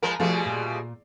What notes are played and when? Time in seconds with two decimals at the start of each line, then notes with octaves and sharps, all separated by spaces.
0.03 F3 G#3 A#4 B5
0.20 B2 F3 G3 A3 F4 G#4
0.46 A#2